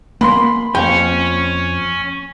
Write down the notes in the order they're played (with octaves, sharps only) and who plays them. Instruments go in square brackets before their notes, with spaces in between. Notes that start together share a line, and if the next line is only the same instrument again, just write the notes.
[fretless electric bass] A#3 [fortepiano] B5 C6
[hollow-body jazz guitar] F2 G5 [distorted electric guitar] C#4